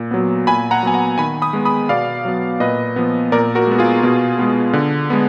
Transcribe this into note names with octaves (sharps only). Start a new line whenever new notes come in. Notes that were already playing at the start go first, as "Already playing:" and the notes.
Already playing: A#2
F#3 B3
A#2 G#5 B5
F#5 A#5
F#3 B3 G#5
F#5 A#5
D#3 G#5 B5
B5 D#6
G#3 B3
B5 D#6
B2 D5 F5
F#3 B3
A#2 B4 D#5
F3 B3
A#2 A#4 D5
F#4 A#4
G#3 B3
F4 G#4
B2
G#3 B3
D3
G#3 B3